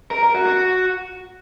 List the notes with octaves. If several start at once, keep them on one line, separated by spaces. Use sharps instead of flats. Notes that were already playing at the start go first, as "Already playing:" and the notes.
A#4
A#4
F#4
F#4